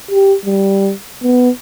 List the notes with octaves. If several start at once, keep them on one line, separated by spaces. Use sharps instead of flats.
G4
G3
B3